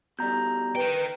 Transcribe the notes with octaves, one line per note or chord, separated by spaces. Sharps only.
B2 G3 A#5 G6
A#4 B4 G5